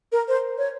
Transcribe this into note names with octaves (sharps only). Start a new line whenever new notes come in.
A#4
C5
C#5